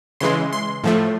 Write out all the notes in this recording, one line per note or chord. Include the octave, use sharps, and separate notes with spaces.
C#3 E3 G#3 C6
C6
A2 F3 A3